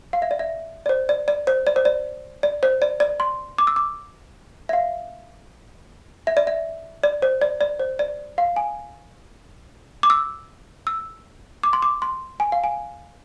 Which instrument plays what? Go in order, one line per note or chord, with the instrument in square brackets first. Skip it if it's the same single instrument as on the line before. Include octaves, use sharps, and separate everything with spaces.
[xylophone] F5
E5
D5
E5
D5
C5
D5
D5
C5
D5
C5
D5
D5
C5
D5
D5
C6
D6
E6
D6
E5
F5
E5
D5
E5
D5
C5
D5
D5
C5
D5
F5
G#5
D6
E6
E6
D6
C6
D6
C6
G#5
F5
G#5